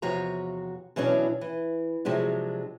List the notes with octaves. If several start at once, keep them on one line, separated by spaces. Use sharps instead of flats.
E2 C3 F3 F#4 C#5 A#5
B2 E3 F#3 C#4 D4
E3
C3 F3 F#3 G#3 D4